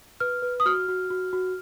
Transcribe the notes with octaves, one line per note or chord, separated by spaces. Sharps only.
B4 F6
B4
D#6
F#4 F6
F#4
F#4
F#4